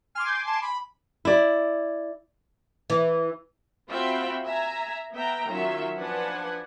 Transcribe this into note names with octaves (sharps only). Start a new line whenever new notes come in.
G#5 C6 D6 F6
G6
A5
B5
E4 D5
E3
C4 F4 F#4 E5 G5 B5
E5 G#5 A#5
B3 E5 G5 A#5
D#3 F#3 C#4 F4 E5
F3 D4 B4 F#5 G#5